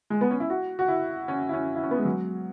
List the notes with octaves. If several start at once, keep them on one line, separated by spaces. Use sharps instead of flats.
G#3
B3
C#4
E4
F#4
F#4
E4
C#4
E4
C#4
E4
C#4
B3
G#3
F#3